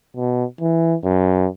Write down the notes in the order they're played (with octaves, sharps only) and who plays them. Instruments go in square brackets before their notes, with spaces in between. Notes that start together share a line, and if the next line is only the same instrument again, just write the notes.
[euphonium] B2
E3
F#2